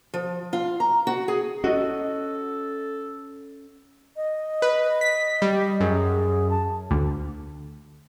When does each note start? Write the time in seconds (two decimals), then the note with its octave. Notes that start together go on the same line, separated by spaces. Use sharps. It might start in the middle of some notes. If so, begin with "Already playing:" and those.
0.14 F3
0.53 F4
0.80 A#5
1.07 F#4
1.28 G#4
1.64 C#4 F#4 A4 D#5
4.16 D#5
4.62 B4
5.01 B6
5.42 G3
5.80 F#2 G#4
6.50 A5
6.91 D2